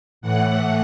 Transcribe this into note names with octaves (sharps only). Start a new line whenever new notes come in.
A2 E3 F#5